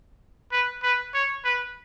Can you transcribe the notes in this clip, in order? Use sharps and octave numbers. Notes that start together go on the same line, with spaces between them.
B4
B4
C#5
B4